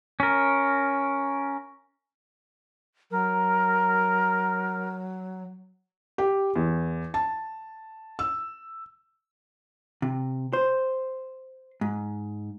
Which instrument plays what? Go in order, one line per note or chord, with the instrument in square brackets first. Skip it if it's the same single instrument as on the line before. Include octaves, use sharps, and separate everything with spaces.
[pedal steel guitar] C#4 A#4
[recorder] F#3 [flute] A#4
[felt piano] G4
E2
A5
E6
[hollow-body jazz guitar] C3
C5
G#2